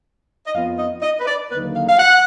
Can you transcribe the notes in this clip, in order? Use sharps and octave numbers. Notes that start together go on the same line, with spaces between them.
D#5
F2 F3 B3 F4 F5
D#5
D#5
B4
D5
D#2 D3 F#3 A#3 D#4 B4
F5
F5
F#5